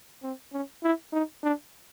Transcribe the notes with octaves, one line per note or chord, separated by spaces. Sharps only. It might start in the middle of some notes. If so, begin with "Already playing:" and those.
C4
C#4
E4
D#4
D4